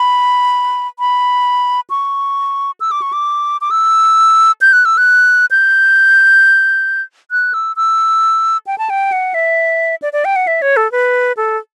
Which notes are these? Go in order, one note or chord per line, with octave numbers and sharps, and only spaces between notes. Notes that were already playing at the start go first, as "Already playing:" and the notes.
Already playing: B5
B5
C#6
E6
D6
C#6
D6
D6
E6
G6
F#6
E6
F#6
G6
F#6
E6
E6
G5
A5
G5
F#5
E5
D5
D5
G5
F#5
E5
C#5
A4
B4
A4